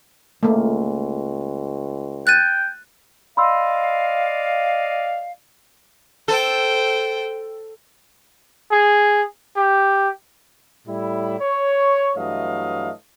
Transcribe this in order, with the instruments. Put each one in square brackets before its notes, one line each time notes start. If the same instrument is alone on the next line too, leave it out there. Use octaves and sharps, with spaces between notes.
[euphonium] C#2 [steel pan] A3 A#3
[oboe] G5 [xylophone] F#6 A6 D#7
[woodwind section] D5 D#5 F5 [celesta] B5 C6 E6
[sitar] A4 [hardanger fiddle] C5 G5
[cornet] G#4
G4
[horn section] A2 G3 E4
C#5
G2 E3 F#3 A3 D#5 F5